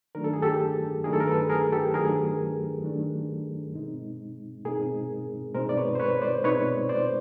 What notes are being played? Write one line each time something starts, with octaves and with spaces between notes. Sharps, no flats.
D#3 F#3 A3 D4 A#4
A4
G#4
G4 A4
D#3 F#3 A3 D4 G#4 A#4
A4
A#4
A4 B4
G#4 A#4
G4 A4
D#3 F#3 A3 D4 G#4 A#4
D#3 F#3 A3 D4
B2 G#3 C4 D#4
B2 G#3 C4 D#4 G#4 A#4
B2 G#3 C4 D#4 A#4 C5
D5
B4 C#5
C5
B4 C#5
C5 D5
B2 G#3 C4 D#4 B4 C#5
C5 D5